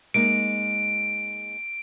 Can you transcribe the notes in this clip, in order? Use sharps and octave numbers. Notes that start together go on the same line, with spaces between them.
G#3 A#3 D#4 D7